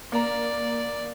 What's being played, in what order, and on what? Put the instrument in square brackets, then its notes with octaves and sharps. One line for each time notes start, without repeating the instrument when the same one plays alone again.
[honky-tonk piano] A#3 A#5 [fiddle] D5